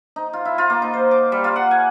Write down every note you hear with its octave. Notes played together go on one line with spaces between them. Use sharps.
D#4
F4
E4
F4
A#3
D#4
C5
D6
G3
F4
F#5
G#5